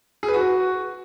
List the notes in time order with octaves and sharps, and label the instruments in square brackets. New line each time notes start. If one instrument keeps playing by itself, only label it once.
[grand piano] G#4
B4
F#4